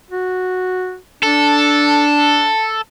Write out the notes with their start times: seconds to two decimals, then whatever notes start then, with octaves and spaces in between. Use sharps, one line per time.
0.11 F#4
1.23 D4 A4